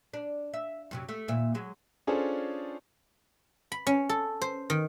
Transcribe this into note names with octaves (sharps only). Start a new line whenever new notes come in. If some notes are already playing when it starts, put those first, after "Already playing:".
D4
E5
F#2 C3 F#3
A3
D#2 A#2 E5
F#3 G#3
C#4 D4 F4 G#4 A4 C5
B5
C#4
A4
C5
D#3